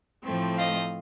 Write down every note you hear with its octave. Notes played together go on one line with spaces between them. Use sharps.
A2 F3 A3 C4
D#5 F5